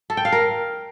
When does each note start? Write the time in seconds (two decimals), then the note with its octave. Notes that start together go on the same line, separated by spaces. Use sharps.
0.10 A4
0.17 G5
0.25 F5
0.32 A#4